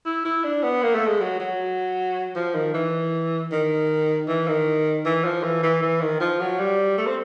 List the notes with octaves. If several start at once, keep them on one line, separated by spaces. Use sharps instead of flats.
E4
E4
D4
B3
A#3
A3
G#3
F#3
F#3
F3
D#3
E3
D#3
E3
D#3
E3
F3
E3
E3
E3
D#3
F3
F#3
G3
A3
C4